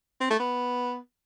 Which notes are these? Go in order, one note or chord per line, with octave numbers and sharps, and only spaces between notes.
C4
A3
B3